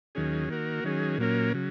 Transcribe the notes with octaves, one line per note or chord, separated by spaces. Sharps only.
D#2 D#3 F#3 C#4 G#4
D#3 A#3 F#4 A#4
D#3 F#3 C#4 G#4
A#2 F#3 A#3 C#4 A#4
C#3 F#3